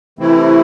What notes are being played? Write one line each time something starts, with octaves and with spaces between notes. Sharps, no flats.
C3 E3 A3 C4 E4